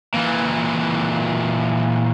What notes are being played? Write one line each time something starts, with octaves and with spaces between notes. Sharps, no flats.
A#2 E3